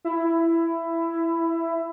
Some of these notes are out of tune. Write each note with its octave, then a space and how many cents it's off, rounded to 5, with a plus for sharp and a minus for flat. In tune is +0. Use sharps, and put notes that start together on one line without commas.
E4 +15